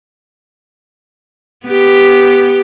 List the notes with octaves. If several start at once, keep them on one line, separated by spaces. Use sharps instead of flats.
B3 G4